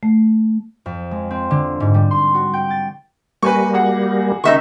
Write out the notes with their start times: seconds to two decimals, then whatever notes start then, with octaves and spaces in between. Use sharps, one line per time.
0.03 A3
0.86 F2
1.11 G#3
1.31 C4
1.51 D3
1.80 G#2
1.94 G3
2.11 C6
2.34 F#4
2.54 G5
2.70 A6
3.43 G3 A#3 B4 G#5 C#6
3.74 F#4 G#4 F#5
4.44 C#2 D#3 D#4 E5 C#6